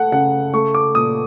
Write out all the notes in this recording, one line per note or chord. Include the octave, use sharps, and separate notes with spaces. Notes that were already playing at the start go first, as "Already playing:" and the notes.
Already playing: A3 F#5
C#3 F#5
A3 C#6
D6
A#2 D#6